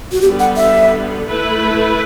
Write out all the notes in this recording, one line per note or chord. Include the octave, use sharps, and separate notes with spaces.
F#4
D3 G3 B3 G4
F#5
E5
A3 E4 B4